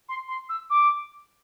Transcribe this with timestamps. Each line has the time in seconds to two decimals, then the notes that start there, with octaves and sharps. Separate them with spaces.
0.09 C6
0.28 C6
0.49 E6
0.70 D6